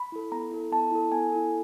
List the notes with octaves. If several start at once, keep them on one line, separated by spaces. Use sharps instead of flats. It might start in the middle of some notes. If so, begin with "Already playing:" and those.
Already playing: B5
E4 A4
B3 A#5
E4 A4
B3 A5
E4 A4
B3 G#5
E4 A4